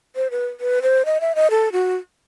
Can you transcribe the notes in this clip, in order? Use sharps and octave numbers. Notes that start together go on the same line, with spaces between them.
C5
B4
B4
C5
D#5
E5
D#5
A4
F#4